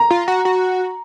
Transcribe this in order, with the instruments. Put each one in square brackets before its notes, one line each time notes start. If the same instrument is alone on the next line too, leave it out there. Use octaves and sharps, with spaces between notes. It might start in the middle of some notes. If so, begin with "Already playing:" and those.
Already playing: [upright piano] A#5
[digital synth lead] F4
F#4
F#4